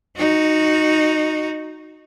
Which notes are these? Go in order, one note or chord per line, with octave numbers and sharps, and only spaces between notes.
D#4 F#4